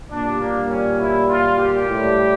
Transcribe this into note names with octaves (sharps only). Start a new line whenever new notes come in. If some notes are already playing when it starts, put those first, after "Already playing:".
A#2 G3 D4
A#3
C#4
E4
F4
G4
A2 G3